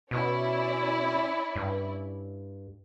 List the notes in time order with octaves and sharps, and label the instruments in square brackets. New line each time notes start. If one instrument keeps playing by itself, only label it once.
[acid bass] B2 [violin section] C#4 E4 D5
[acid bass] G2